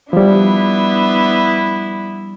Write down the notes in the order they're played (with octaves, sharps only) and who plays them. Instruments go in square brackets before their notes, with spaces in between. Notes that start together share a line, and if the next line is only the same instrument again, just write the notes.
[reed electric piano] F3 G3 [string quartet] B3 D4 E4